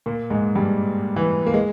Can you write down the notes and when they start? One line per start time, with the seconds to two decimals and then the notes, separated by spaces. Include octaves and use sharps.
0.06 A#2 A#3
0.30 G#2 G#3
0.55 G2 G3
1.16 E3
1.46 A#3
1.54 G#3